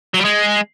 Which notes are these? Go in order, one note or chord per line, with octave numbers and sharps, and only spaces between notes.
F#3
G3
G#3